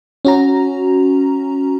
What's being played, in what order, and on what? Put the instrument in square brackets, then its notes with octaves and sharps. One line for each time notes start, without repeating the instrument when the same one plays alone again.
[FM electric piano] C#4 F#4 A#5